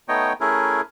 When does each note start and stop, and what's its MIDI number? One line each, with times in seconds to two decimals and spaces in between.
0.08 0.33 57
0.08 0.33 59
0.08 0.33 63
0.08 0.33 73
0.08 0.33 75
0.08 0.33 79
0.40 0.81 57
0.40 0.81 61
0.40 0.81 64
0.40 0.81 68
0.40 0.81 70